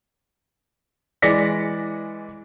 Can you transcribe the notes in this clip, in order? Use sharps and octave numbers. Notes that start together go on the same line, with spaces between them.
E3 G#3 D5 A#6 B6 C#7